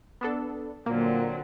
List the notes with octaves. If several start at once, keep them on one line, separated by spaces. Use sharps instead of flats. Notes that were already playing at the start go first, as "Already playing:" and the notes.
B3 D4 A4
A#2 D3 F#3 A#3 C4